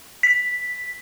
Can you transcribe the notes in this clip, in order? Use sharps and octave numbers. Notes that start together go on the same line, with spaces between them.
B6